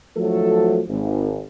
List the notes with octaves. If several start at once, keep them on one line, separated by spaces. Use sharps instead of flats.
G#1 F3 F#3 A3 F#4 A4
G#1